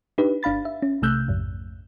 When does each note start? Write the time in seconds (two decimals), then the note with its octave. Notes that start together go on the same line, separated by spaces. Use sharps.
0.18 D4 D#4 G4 B4
0.43 G1 D4 F5 B5 A6
0.65 E5
0.82 C#4
1.02 B1 C3 A3 E6 F#6 G6
1.28 A#1 F2 G#2